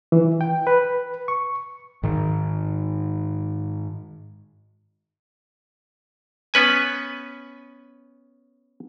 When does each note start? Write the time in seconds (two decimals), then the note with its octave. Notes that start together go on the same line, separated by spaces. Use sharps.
0.12 E3
0.41 G5
0.67 B4
1.28 C#6
2.03 G#2 D#3
6.54 B3 C#4 B4 G#5